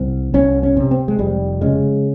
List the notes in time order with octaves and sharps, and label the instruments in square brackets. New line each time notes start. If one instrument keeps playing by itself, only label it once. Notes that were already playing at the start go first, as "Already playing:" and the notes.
Already playing: [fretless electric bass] C2 C4
C2 C#4
C#4
C3
C4
G#3
F1 G3
C#3 G#3